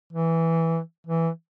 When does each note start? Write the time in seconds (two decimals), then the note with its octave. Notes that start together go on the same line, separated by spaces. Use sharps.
0.13 E3
1.07 E3